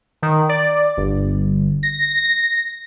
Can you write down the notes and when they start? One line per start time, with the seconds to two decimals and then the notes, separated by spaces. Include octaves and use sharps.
0.23 D#3
0.49 D5
0.97 G1
1.83 A#6